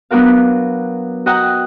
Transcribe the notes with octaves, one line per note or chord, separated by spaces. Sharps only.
F#3 B3 D4 F#4 A#4 F5
F#4 D#5 F#5 G5 A#5 F#6